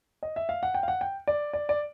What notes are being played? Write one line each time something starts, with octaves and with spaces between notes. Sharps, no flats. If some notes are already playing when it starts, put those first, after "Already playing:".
D#5
E5
F5
F#5
G5
F5
F#5
G5
D5
D5
D5